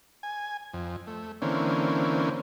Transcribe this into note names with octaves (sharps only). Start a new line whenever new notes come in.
G#5
F2
A3
D3 E3 A#3 C4 C#4